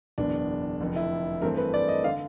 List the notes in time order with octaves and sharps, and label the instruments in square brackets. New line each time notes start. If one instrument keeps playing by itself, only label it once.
[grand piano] F#1 E2 B2 D4
F1 F2 D3
E4
G2 E3 A3 C4 A#4
B4
D5
D#5
D3 F5